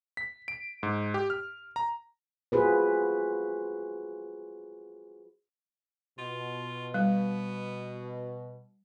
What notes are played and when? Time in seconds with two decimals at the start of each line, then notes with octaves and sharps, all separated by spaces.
0.17 B6
0.48 D7
0.83 G#2
1.14 G4
1.30 F6
1.76 A#5
2.52 F4 F#4 G#4 B4 C5
6.18 B2 F4
6.94 G3 B3